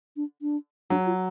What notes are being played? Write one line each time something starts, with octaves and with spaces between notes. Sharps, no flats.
D4
D4
F#3 D4
F4